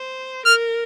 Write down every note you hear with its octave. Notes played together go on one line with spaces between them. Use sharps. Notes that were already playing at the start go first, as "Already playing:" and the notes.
Already playing: C5
A#4 F6